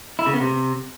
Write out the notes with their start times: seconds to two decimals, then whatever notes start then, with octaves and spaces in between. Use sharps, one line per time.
0.19 E4
0.26 C#3
0.33 B3
0.41 C3